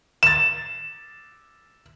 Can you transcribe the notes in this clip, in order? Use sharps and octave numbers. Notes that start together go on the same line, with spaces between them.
A6 E7